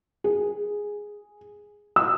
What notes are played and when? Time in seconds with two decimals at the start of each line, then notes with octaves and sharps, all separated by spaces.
0.24 G#4
1.96 E6